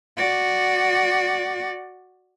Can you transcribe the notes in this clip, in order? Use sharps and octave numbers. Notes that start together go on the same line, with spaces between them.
F#4 D5